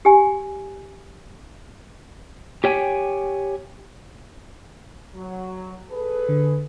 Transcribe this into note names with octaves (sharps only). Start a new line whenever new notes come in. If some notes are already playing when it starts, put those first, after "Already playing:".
G4 G#5
G4 C#5 G5 G#5
F#3
G#4 A4 B4
D3